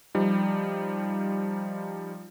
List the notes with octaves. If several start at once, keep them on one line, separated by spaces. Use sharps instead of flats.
F3 G3 D#4